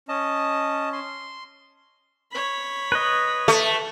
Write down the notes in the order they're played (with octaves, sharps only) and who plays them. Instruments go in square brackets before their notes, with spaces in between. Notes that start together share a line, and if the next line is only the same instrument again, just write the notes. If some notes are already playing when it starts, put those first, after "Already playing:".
[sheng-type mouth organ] C#4 [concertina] D#5 A5
[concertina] C6
[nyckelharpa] C#5 B5
[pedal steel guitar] B4 D#5
[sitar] A3